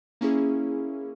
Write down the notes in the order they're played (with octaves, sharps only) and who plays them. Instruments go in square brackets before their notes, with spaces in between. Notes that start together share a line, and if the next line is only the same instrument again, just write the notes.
[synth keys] A#3 C#4 E4 G#4